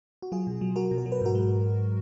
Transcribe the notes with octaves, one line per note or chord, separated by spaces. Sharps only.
F#4
F#3 F4 G#4
B2
F#3
F#3 F#4 A#4
B2
A#4
F#3
B4
G#2 F#4 A#4
G#3